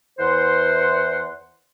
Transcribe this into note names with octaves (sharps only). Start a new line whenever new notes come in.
E2 E3 C5 F#5 C6